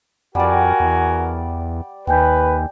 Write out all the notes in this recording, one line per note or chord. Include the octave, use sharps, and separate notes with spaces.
F2 G3 F#4 A#4 D5 F#5 G#5
E2
D#2 B4 G5 G#5 G6